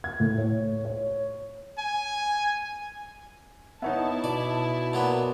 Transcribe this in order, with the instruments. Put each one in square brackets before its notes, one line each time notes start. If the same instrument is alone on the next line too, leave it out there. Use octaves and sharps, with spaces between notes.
[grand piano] G#6
A2
C#5
C#5
[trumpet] G#5
[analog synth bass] B3 [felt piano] D#4 C#5 E5 [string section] E4 A5
[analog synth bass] B2 [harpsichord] D5
[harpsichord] A#2 F#3 B3